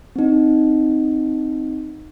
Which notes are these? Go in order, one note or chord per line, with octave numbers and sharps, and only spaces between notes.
C4 D#4